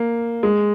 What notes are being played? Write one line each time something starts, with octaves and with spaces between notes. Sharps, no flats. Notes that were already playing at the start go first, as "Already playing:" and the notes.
Already playing: A#3
G#3